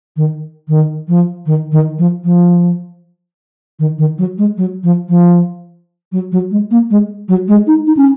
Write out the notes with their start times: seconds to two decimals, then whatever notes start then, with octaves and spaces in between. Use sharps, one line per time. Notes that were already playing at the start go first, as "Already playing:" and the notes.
0.16 D#3
0.68 D#3
1.08 F3
1.46 D#3
1.72 D#3
1.98 F3
2.24 F3
3.79 D#3
3.98 D#3
4.18 F#3
4.38 G#3
4.57 F#3
4.83 F3
5.09 F3
6.12 F#3
6.32 F#3
6.51 G#3
6.71 A#3
6.90 G#3
7.28 F#3
7.48 G#3
7.67 D#4
7.87 D#4
7.97 C#4